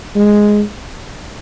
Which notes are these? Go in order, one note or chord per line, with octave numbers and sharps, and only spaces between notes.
G#3